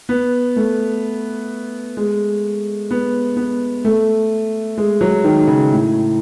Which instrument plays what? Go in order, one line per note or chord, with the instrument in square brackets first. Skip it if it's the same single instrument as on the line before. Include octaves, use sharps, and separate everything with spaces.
[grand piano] B3
A3
G#3
B3
B3
A3
G#3
F#3
D#3
C#3
A2